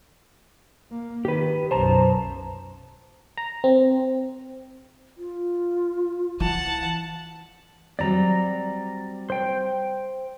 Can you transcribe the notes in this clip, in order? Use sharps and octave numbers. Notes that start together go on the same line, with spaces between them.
A#3
D#3 G4 B4
B1 F#2 C5 A5 A#5
A#5
C4
F4
E3 F#5 A5
F#3 G3 C4 D5 A#5
C5 G5